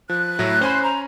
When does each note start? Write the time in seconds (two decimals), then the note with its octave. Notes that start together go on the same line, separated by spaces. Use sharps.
0.09 F3 F#6
0.39 A2 F#3 E5 A#6
0.61 C#4 C5 G#5 B5
0.82 A#5